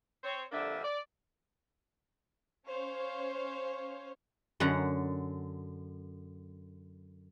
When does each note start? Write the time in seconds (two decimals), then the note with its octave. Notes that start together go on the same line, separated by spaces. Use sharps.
0.24 C4 C5 C#5
0.52 F2 D3 G3 A#3 D4 E5
0.84 D5
2.68 C#4 C5 C#5 F5
4.60 F#2 D3 F#5 A#5